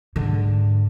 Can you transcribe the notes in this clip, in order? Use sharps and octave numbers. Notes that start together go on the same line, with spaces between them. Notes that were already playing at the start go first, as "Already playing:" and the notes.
G#2 D3